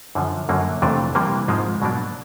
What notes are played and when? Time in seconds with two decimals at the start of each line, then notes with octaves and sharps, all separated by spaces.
0.15 F#2 D3 F3
0.49 F#2 D3 F#3 A#3
0.82 F2 C3 E3 A3 D4
1.15 C3 E3 G3 A#3
1.48 G#2 F3 G#3 C4
1.82 B2 F#3 A#3 D4